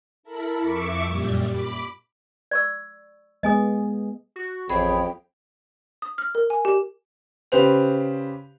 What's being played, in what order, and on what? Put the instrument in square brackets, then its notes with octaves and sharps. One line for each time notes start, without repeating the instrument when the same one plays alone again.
[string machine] E4 A4 A#4 B5
F2 E5 C#6 D6 C#7
F#2 A#2 G3
B5 D6
[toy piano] D5 C#6 E6
[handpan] G#3 B3 G#4 [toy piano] D#5 G#5 D#6
[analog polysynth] F#4
[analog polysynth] A1 G#4 C#5 [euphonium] F2 [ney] G5 [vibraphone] B5
[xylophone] D#6
F6
A#4
G#5
G4
[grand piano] C#3 G4 B4 C5 F7